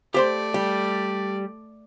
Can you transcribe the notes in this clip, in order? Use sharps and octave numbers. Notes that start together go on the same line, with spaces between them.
A3 G4 C5 D5 C6
G3